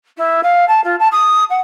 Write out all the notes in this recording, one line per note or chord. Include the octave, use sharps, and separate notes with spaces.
E4
F5
A5
F4
A5
D#6
F#5